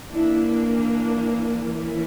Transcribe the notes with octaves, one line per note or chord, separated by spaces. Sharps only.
E3 A#3 D4 E4
D4
E3 A#3 C#4 E4